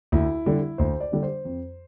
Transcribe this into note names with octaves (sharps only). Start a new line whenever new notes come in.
D2 E4
D3 G3 D4
D2 C5
D5
D3 G3 D4
C5
F2